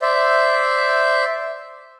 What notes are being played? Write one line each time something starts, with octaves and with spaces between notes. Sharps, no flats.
C5 D5 E5